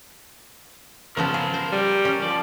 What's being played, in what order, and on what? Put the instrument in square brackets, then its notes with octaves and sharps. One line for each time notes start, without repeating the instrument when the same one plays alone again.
[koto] C#3 F3 B3 [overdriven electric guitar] A#4 A5
[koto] G#4
C5
[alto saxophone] G3
[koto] C#4
[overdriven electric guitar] F3 [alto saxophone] D5